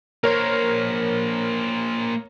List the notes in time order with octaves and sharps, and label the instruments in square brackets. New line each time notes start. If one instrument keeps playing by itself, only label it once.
[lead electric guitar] A#3 C5 [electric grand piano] A#4 C#5